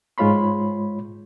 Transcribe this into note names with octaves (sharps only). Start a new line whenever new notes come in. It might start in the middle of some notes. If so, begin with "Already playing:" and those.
G#2 G#3 F4 C#5 B5 C6